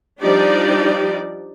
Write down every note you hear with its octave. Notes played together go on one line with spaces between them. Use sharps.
F3 G3 D4 D#4 G4 D5